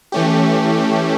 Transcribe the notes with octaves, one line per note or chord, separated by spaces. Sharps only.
E3 A3 C#4 G4